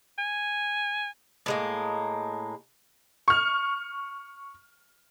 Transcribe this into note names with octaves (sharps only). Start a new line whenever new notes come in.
G#5
A2 G#3 A#3
C#6 F6